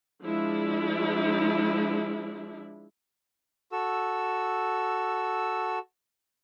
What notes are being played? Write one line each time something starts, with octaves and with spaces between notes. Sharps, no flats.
F3 G#3 D4 E4
F#4 A4 E6